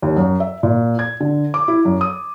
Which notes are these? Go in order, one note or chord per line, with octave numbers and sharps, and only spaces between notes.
D#2
F#2
E5
A#2
G#6
D3
D6
E4
F#2
D#6